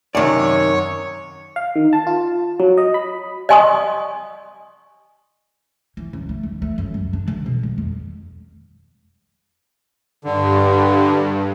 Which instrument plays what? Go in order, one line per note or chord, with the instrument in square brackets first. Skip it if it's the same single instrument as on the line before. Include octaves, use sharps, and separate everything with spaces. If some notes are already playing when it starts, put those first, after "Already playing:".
[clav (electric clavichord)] F#2 C3 [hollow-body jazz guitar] D#3 D5 [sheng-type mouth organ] C#5
[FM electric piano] F5
D#3
A5
F4
F#3
D#5
B5
[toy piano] D5 D#5 G#5 C6 C#6 D#6
[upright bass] E3
C#2
A3
D#2
A3
F#2
C#2
D4
D3
B2
D#3
F2
[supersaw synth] G2 [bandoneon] D3